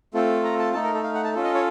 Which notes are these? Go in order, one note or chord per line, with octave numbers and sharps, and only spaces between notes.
A3 C4 F4 A4
A#5
A5
A3 D#4 A4 A5
A#4
A4
F5
F#5
A5
C#4 F4 A4
D#5
C#5